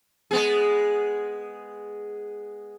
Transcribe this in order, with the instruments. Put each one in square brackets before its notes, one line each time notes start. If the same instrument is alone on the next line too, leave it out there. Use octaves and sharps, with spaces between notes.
[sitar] G#3 B3 G#4